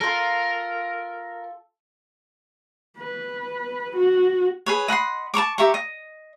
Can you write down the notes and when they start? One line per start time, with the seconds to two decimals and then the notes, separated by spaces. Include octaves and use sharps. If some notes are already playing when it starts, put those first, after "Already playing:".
0.01 F4 A4 A#4
2.97 B4
3.96 F#4
4.66 G#4 B4 C#5
4.88 D#5 F#5 B5 C6
5.34 A5 A#5 C#6 D6
5.58 G4 E5 A#5 C#6
5.74 D#5